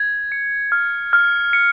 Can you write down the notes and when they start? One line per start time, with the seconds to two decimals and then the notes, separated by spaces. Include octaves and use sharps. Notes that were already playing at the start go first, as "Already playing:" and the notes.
Already playing: G#6
0.32 C#7
0.72 F6
1.13 F6
1.53 C#7